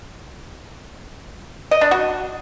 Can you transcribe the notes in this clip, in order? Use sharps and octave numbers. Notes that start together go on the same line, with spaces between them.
D#5
D4
F#4